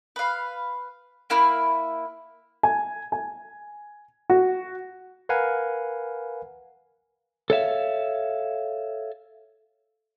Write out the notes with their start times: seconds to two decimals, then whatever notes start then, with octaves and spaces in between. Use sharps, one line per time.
0.16 B4 F5
1.30 A#3 E4 B5 F6
2.63 G#5
3.12 G#5
4.30 F#4
5.29 A#4 B4 F5 F#5 G#5
7.50 A4 C#5 E5 F5